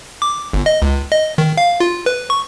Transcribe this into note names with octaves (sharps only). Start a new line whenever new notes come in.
D6
G1
D#5
C#2
D#5
D#3
F5
F4
B4
C#6